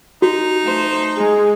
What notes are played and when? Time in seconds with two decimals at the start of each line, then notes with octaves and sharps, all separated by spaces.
0.22 D#4 F#4
0.63 A3 C5
1.17 G#3 G#4